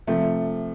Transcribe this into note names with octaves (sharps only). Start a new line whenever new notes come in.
C3 F3 A3